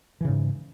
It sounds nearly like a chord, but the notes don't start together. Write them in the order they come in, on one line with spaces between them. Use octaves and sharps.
E3 C#3 G#2